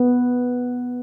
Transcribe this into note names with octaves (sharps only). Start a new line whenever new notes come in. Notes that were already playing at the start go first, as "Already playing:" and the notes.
Already playing: B3